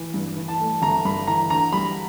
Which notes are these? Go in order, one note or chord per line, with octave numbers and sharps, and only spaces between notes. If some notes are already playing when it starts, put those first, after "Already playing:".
Already playing: E3
G2
E3
A5
A3
G1 A#5
G2 B5
E3 A#5
D3 A#5
G3 B5